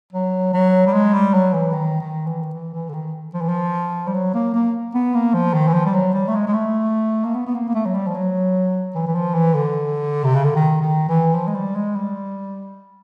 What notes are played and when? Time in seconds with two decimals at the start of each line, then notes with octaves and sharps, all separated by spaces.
0.13 F#3
0.53 F#3
0.87 G3
0.93 G#3
1.14 G3
1.34 F#3
1.53 E3
1.73 D#3
2.00 D#3
2.27 E3
2.43 D#3
2.54 E3
2.74 E3
2.89 D3
2.94 D#3
3.34 F3
3.41 E3
3.49 F3
4.07 G3
4.14 F#3
4.34 A#3
4.54 A#3
4.94 B3
5.15 A#3
5.34 F3
5.54 D#3
5.68 E3
5.74 F3
5.85 G3
5.94 F#3
6.14 G3
6.28 A3
6.35 G#3
6.47 G#3
6.54 A3
7.24 A#3
7.34 B3
7.47 B3
7.54 A#3
7.68 A#3
7.75 A3
7.86 F#3
7.94 G3
8.07 F3
8.14 F#3
8.95 E3
9.06 E3
9.15 F3
9.34 E3
9.54 D3
10.24 C3
10.35 C#3
10.44 D3
10.55 D#3
10.82 D#3
11.08 E3
11.35 F3
11.47 G#3
11.55 G3
11.75 G#3
11.96 G3